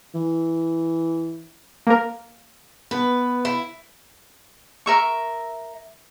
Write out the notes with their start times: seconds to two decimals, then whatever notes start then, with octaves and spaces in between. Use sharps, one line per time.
0.14 E3
1.87 A#3 A#4
2.91 B3 B4
3.45 E4
4.86 A#4 E5 C#6